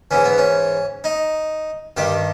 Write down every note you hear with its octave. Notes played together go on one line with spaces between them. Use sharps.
G#2 E3 C#4
B3
C#4
D#4
G2 D#3 G4